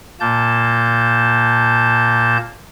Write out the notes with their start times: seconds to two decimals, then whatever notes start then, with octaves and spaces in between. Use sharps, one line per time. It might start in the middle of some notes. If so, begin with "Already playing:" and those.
0.20 A#2 A#3 A5 G6